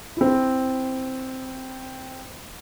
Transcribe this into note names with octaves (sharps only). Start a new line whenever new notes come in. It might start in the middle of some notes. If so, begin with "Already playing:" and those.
C4 E4